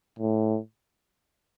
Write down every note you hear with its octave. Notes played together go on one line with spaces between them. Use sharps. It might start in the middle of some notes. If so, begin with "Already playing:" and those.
A2